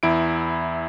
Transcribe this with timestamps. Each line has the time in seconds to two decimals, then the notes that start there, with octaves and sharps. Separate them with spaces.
0.03 E2 E4 D7